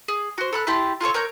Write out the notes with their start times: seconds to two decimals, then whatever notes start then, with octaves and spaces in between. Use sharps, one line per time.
0.08 G#4
0.38 F#4 C5
0.53 A4 B5 F#6
0.67 E4 G4 A5 C6
1.01 F4 G#4 A4 C#5
1.14 A#4 C#5 A#5 G6